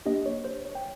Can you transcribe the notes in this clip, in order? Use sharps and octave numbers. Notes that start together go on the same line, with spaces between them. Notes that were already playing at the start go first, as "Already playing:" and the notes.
A#3 D4 G4 D#5
C#5
C5
C#5
G5